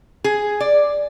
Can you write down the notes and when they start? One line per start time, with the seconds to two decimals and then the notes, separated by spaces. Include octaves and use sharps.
0.24 G#4
0.60 D5